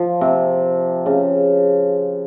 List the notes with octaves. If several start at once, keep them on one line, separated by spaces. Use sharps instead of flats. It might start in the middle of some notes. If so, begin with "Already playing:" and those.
Already playing: F3
C3
C#3